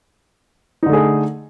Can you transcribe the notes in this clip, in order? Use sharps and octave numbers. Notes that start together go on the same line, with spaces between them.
D3 A3 D#4 G#4